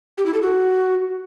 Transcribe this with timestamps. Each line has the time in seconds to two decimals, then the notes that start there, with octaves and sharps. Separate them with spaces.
0.18 G4
0.26 E4
0.34 A4
0.42 F#4